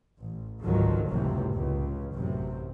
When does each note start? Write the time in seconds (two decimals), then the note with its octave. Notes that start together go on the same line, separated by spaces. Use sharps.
0.20 A1
0.63 G#1 C#2 D3 D#3 F3 F#3
1.08 F#1 C#2 A2 C3 E3
1.52 C#2
2.13 A1 F#2 C3